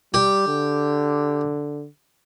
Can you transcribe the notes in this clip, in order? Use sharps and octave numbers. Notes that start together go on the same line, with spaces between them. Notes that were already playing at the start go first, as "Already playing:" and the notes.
G3 G4
D3